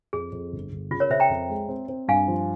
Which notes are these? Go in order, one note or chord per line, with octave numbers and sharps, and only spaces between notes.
F2 G#4
F2
G1
G1
C#3 F4
A#4 C#5
C#3 C5 E5
G5 A#5
F2
G#3
C4
C4
G2 F5 G#5
F3